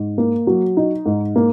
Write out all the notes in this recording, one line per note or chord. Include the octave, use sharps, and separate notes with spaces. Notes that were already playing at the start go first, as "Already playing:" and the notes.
Already playing: G#2
A#3
F#3
D#4
G#2
A#3